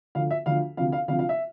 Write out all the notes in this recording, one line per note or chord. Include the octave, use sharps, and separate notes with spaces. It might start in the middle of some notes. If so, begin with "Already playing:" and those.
D2 D3 F3 F5
E5
D2 D3 F3 F5
D2 C3 F3 F5
F5
D2 C3 F3 F5
F5
E5